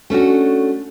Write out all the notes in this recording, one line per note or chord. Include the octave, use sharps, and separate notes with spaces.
A3 C#4 D4 F#4